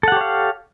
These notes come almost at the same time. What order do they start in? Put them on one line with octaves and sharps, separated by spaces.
A4 F#5 G4 C#5 F5